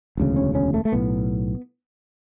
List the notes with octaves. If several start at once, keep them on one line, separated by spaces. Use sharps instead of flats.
E1 D2 C#3
C#4
C#4
A3
A3
B1 A2 B3